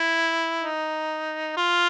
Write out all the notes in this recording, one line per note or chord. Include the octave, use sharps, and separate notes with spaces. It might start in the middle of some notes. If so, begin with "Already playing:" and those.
Already playing: E4
D#4
F4